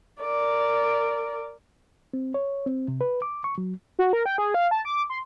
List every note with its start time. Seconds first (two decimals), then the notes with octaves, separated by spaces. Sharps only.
0.21 A#4 D5
2.14 C4
2.34 C#5
2.66 C4
2.88 C3
3.01 B4
3.22 D6
3.44 C#6
3.58 F#3
3.99 F#4
4.13 A#4
4.26 G5
4.38 G#4
4.54 F5
4.71 A5
4.85 D6
5.10 C6